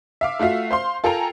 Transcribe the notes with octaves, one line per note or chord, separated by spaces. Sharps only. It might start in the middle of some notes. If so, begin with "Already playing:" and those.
E5 F5 D6
A3 F4 F#4 E5 F5
C5 F5 C6
F4 A4 A#4 G5 G#5 A#5